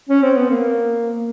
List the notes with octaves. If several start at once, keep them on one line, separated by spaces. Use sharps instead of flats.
C#4
C4
B3
A#3